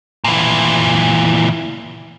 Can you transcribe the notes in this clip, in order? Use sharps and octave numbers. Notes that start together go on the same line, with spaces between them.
A#2 E3